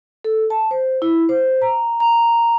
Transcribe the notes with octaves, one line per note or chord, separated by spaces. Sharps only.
A4
A5
C5
E4
C5
A#5
A#5